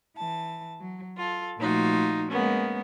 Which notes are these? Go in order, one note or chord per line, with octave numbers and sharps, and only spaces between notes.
E3 A5
F#3
F4 A4
A#2 F3 A3 D#4 F4 F#4
G#3 A#3 B3 C#4